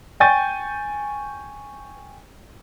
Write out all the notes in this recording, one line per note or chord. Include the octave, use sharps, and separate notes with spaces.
G5 G#5 C#6 G6 A6 D#7